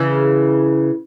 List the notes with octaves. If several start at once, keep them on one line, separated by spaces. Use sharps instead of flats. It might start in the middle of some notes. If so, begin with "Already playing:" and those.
Already playing: C#3 E3